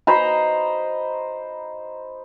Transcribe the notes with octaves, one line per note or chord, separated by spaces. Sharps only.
C5 D#5 A#5 B5